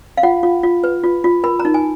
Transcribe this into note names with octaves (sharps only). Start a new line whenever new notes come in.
F5
F4 F#5
F4
F4
B4
F4
F4
A#4 B5
A#5
D#4
G#5